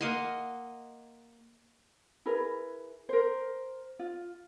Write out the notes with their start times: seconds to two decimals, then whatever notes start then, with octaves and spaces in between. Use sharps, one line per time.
0.01 A#3 D#5 F#5 C6
2.26 E4 G#4 A#4 B4
3.09 A#4 C5
3.99 F4